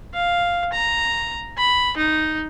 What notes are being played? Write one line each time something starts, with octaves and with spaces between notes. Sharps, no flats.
F5
A#5
B5
D#4